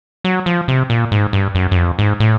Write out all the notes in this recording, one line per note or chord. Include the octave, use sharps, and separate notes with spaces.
F#3
F3
C3
A#2
G#2
G2
F#2
F#2
F2
G#2
A2